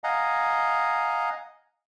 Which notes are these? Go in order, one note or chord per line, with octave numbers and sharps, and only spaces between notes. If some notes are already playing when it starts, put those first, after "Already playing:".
D#5 F5 F#5 G#5 A#5